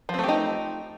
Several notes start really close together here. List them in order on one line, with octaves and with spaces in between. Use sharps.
F3 C4 A3 G4 D#4